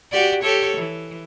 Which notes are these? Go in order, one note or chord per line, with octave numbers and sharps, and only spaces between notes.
F#4 G4 D5
G4 A4 C#5
E3